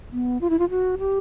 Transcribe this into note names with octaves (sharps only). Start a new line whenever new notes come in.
B3
F4
E4
F4
F#4
G4